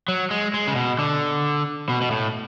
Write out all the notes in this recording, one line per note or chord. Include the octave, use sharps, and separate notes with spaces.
F#3
G#3
G#3
C#3
B2
D3
B2
B2
A2